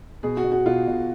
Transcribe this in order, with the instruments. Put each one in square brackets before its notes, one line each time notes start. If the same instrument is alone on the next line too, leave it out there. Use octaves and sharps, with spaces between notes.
[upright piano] B2 G#4
F#4
B2
F#4
B2 F4
B2